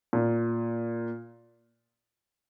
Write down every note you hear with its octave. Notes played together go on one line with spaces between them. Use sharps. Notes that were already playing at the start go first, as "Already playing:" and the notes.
A#2